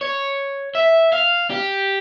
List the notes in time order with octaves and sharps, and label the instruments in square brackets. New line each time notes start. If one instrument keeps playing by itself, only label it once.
[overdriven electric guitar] C#5
E5
F5
G4